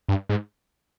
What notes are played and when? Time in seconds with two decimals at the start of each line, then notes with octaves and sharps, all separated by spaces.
0.09 G2
0.29 G#2